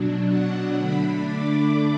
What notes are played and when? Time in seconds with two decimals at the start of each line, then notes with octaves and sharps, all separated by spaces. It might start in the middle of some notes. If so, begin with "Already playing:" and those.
Already playing: B2 F#3 D4
0.27 F#5
0.76 D3 A3 D4 B5
1.25 D6